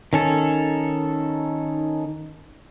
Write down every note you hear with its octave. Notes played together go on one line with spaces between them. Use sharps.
D#3 C#4 A4